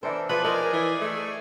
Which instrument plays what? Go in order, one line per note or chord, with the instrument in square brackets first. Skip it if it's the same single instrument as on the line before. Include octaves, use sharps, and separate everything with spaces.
[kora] E3 C5 [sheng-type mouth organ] D4 A4 A#4
[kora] F3 [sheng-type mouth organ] G#4 D5 G#5 [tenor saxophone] B4
[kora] D#4 C5 [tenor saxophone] A#4
[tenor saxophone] E3
A3